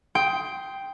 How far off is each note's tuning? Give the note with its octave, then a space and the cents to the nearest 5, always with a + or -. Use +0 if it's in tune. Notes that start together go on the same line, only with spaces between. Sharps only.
G5 +0 C6 +0 D#6 +25